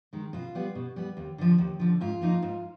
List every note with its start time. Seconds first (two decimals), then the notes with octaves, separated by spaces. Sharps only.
0.13 D#3 G#3
0.33 B2 F4
0.55 G3 B3
0.75 B2
0.96 G3 B3
1.17 D#2
1.38 D3 F3
1.58 D#2
1.80 D3 F3
2.01 G#2 F4
2.21 F3 A#3 D#4
2.42 G#2